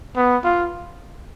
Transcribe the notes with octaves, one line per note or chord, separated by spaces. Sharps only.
B3
F4